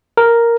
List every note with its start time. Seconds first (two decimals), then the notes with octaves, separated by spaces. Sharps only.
0.17 A#4